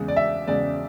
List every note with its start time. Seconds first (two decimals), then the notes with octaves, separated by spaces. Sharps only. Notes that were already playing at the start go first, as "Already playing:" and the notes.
Already playing: E2 C#3 G#3
0.08 D5
0.16 E5
0.47 E2 C#3 G#3 D5